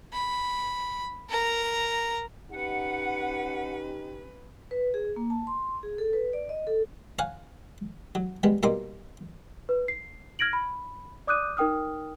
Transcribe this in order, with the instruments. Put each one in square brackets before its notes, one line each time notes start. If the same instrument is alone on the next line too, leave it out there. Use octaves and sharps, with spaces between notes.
[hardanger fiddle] B5
A#4 A#5
[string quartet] C#4 B4 [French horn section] D#4 G4 [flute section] F#5
[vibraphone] B4
G#4
A#3
A5
C6
G#4
A4
B4
D5
D#5
A4
[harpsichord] C#5 F5 F#5 G#5
F#3
G3 G#3 B3
B2 G3 A#3 D#4 C6 D6
[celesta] B4
C7
F6 G#6 A#6 D7 F#7
B5
D5 D6 D#6 F#6 G6 D#7
D#4 A#4 G5 D#6 F6